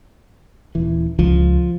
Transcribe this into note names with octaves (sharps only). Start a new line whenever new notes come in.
D#1 E3
C#2 F3